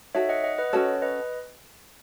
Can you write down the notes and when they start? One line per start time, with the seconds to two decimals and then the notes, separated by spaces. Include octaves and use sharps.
0.15 D#4 F#4 A4 C#5 E5
0.29 D#5 F#5
0.44 D#5 F#5
0.58 B4 D#5
0.73 C#4 F#4 A4 C#5
1.02 B4 D#5